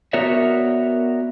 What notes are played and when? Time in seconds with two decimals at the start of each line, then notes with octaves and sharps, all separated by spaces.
0.13 B3 F#4 A#4 C#5 D5 E5